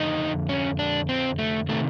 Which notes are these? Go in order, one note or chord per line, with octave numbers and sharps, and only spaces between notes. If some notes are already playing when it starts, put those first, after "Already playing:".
Already playing: F2 D3 D#4
C#4
D4
C4
A3
C3 D#3 A3